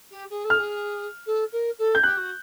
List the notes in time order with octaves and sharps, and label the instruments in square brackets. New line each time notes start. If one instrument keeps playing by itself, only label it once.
[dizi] G4
G#4
A4
[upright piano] F6
[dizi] G#4
A4
A#4
A4
[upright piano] G6
[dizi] G4 [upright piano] F#6
[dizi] F#4